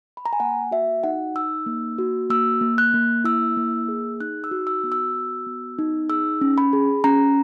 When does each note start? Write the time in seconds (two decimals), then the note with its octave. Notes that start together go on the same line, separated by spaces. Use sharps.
0.17 B5
0.26 A#5
0.33 G#5
0.40 A#3 F#5
0.71 F#4 E5
1.03 D#4 F#5
1.35 D#4 E6
1.66 A#3
1.98 F#4
2.30 A#3 E6
2.61 A#3
2.78 F#6
2.94 A#3
3.24 E4 E6
3.57 A#3
3.88 G#4
4.20 D#4 F#6
4.44 E6
4.51 F#4
4.67 E6
4.84 B3
4.92 E6
5.14 F#4
5.46 B3
5.79 D#4
6.09 G#4 E6
6.41 C#4
6.58 B5
6.73 G#4
7.04 C#4 A#5